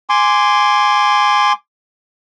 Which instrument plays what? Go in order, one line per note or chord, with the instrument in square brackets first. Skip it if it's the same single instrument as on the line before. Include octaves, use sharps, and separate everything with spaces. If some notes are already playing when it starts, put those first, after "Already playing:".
[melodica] G#5 C6 D6